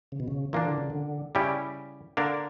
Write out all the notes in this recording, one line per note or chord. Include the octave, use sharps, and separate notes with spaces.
C#3
B2
C#3
A#2 E3 A#3 D4
D3
C#3
D3
C#3 G3 C#4 E4 G4
D3 A#3 D4 A#4